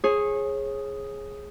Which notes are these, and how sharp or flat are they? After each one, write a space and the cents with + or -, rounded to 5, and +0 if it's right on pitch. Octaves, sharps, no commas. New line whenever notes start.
G#4 +0 C#5 -30